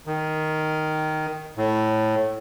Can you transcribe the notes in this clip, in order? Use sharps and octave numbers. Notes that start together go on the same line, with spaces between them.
D#3
A2